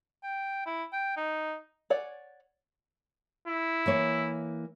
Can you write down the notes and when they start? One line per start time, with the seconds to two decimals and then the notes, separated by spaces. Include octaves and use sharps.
0.23 G5
0.66 E4
0.93 G5
1.17 D#4
1.90 C#5 D5 F#5 G#5
3.48 E4
3.86 E3 A#3 C#5